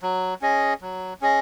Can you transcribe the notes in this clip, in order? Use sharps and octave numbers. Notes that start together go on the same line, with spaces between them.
F#3
C#4 G#4 D#5
F#3
C#4 G#4 D#5